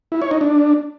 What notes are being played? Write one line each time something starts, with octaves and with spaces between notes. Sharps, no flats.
E4
C#5
D#4
D4